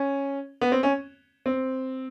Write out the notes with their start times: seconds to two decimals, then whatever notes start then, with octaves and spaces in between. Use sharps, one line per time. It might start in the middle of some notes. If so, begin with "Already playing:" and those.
Already playing: C#4
0.61 B3
0.72 C4
0.83 C#4
1.46 C4